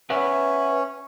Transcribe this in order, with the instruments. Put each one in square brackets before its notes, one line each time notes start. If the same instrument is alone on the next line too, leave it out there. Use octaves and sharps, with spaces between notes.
[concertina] C#4 [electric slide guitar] B4 E5 F#5